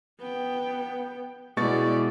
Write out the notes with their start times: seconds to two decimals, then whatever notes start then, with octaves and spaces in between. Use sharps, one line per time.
0.19 B3 G5
1.57 B2 G#3 E4 D5 C#6 A6